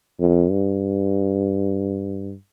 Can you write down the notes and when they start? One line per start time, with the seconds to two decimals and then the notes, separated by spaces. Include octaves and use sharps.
0.20 F2
0.51 G2